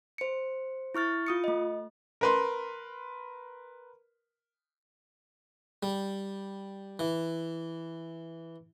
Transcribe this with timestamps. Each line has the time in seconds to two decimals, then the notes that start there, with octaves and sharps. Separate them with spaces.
0.18 C5 C#7
0.95 E4 C#6 F6 A6
1.27 F4 D#6 C#7
1.44 A3 D#5
2.21 A#4 B4 C6
5.83 G3
6.99 E3